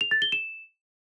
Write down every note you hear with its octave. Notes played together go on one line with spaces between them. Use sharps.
F7
A6
G7
E7